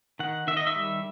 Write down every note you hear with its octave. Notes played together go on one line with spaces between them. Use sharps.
D#3 F#5
D#3 E5
D#5
E5
G3